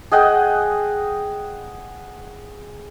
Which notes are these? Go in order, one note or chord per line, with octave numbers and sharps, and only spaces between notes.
G#4 D#5 F#5 G5